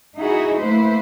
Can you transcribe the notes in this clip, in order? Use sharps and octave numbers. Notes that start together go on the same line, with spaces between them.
D#4 E4 F#4 G#4
A3 A#3 E4 B4 C5